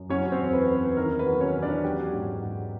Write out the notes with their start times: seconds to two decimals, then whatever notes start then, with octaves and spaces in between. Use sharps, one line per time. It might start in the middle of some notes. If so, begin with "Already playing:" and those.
Already playing: F#2
0.09 F#3 C#4 C#5
0.32 C4 C5
0.39 E2
0.53 B4
0.68 E2
0.75 B4
0.97 D#3 A#4
1.19 B4
1.26 F#3
1.41 C#4 C#5
1.56 E2
1.62 D4 D5
1.84 F#3 G4 G5
2.13 G#2
2.42 G#2